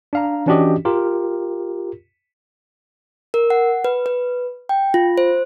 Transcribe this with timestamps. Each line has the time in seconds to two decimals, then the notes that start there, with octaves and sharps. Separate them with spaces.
0.13 D4 F5 A#5
0.46 E3 C#4 D4 F#4 G4 D#5
0.85 F4 G4 A#4
3.34 A#4
3.50 F#5
3.85 B4
4.06 B4
4.69 G5
4.94 F4
5.18 C5